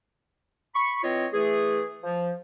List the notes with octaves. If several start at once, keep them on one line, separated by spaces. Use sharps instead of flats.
B5 C#6
E3 C4 F4 C#5 D#5
E3 A3 G#4
F3